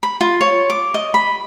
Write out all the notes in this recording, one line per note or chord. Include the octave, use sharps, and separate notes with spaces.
B5
F4
C#5
D6
D#5
B5